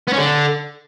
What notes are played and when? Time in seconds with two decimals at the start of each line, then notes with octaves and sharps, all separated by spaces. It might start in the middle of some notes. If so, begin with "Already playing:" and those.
0.08 B3
0.13 C#4
0.18 D3